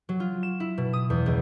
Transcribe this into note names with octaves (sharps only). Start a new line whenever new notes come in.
F#3
F4
E7
E4
B2
D#6
E2
C#2